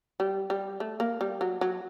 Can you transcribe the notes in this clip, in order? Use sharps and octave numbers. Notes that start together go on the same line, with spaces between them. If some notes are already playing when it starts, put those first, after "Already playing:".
G3
G3
A3
A#3
G3
F#3
F#3